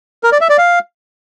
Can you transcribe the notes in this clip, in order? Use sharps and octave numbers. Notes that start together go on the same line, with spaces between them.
A#4
D5
E5
D5
F5